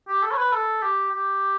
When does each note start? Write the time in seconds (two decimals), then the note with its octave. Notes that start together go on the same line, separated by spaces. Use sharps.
0.08 G4
0.22 A4
0.31 C#5
0.37 B4
0.52 A4
0.82 G4
1.11 G4